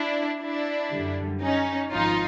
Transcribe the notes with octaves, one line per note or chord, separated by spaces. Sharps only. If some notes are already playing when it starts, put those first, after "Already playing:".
Already playing: D4 E4
D4 E4
F#2 D3 G3
C#4 D#4
G#1 G#2 F3 D#4 F4